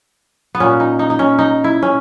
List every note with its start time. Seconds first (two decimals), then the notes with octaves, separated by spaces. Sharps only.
0.55 B3
0.60 A#2 A#3 C#4
0.80 D#4
0.99 D#4
1.10 D#4
1.19 C#4
1.39 D#4
1.64 E4
1.82 C#4